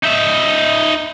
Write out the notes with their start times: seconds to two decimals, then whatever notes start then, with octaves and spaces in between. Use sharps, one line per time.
0.04 D#4 E5